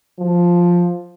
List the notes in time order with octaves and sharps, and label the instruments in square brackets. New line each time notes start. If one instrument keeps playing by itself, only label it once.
[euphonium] F3